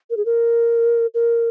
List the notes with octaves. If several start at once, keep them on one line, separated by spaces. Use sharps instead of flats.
A#4
G#4
A#4
A#4